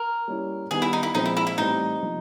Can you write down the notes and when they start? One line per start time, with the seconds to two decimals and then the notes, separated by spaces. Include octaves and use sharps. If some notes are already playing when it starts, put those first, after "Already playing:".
Already playing: A#4
0.28 G3 A#3 C#4 E4
0.71 D#3 G3 B3 G#4
0.82 E4
0.93 D#4
1.03 E4
1.15 A#2 F3 G#3 C4 D#4
1.26 E4
1.37 E4
1.47 E4
1.57 A2 E3 G3 C4 D#4
2.01 C3 F3 A#3